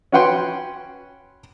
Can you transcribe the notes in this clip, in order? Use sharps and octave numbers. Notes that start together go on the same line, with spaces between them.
C#4 F#4 B4 F#5 G5 C6